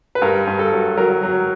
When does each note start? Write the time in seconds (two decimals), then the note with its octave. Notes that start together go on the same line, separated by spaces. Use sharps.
0.15 B4
0.22 G2 A#4
0.47 G2
0.59 A4
0.72 F#3
0.97 F#3 A#4
1.23 F#3